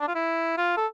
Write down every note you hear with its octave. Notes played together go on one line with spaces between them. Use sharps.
D4
F4
E4
F4
A4